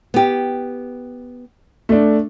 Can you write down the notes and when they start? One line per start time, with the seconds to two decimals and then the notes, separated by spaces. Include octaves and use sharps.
0.14 B3 G4
1.89 A3 D4